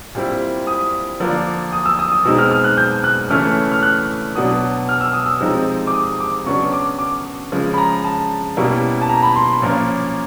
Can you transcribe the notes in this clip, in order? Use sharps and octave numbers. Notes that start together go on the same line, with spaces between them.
A#2 G3 C4 E4
D#6
D3 F3 A#3 D4
D#6
E6
D#6
D#6
B2 G#3 C4 D#4 E6
F6
F6
F#6
G6
F#6
C#3 E3 A3 C#4 E4 F6
F6
F#6
B2 F#3 B3 D4 D#6
F6
E6
D#6
E6
C3 F3 G#3 C4 D#4
D6
D#6
D6
C#3 F#3 B3 D4 C#6
D6
D6
C#3 F3 G#3
B5
A#5
A5
B2 G3 A#3 C#4 E4
A5
A#5
B5
C6
A#2 F3 A#3 C#4